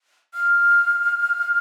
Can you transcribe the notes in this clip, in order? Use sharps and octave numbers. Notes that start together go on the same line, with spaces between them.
F6